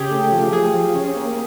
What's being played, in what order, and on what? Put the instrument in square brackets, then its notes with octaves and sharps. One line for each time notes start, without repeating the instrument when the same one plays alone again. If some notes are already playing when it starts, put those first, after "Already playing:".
Already playing: [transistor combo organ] C#3 [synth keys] G4 G#4
[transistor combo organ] A3
F3
[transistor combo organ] F3 [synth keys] G#4
[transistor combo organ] F3
C#4
A#3